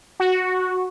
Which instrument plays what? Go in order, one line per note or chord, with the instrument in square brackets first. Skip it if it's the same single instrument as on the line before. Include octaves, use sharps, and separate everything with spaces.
[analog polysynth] F#4